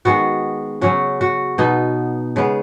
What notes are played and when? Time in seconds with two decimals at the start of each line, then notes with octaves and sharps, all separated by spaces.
0.05 D#3 G#3 B3 F#4
0.81 C#3 F#3 C#4 F#4
1.21 F#4
1.58 B2 B3 D#4
2.36 C#3 G#3 B3